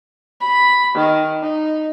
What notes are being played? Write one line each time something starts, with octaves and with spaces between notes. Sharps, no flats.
B5
D#3
D#4